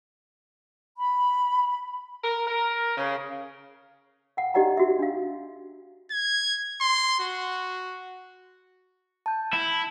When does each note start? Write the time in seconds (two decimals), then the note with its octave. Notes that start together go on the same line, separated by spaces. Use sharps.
0.97 B5
2.24 A#4
2.46 A#4
2.98 C#3
4.37 F5 F#5
4.54 D#4 G4 D5 D#5 F#5 A#5
4.77 F#4 E5
4.99 D4 F5
6.11 G#6
6.81 C6
7.20 F#4
9.26 A5 G6
9.53 E4